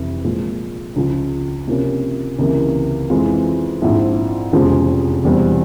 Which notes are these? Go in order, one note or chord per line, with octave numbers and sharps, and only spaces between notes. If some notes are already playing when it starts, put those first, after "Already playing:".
Already playing: F1 F2 C3 E3
A#2 F3 G#3
C#2 C#3 F3
C3 F3 A#3 C#4
C#2 C3 E3 A#3
F2 E3 G#3 C4 F4
A#1 G#2 F3 C4 E4
F1 E2 C#3 F3 G#3
E1 E2 C3 G3 C4